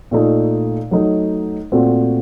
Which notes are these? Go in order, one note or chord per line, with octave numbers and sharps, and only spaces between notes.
A#2 A3 D#4
F#3 A3 D#4
A#2 A3 C4 F#4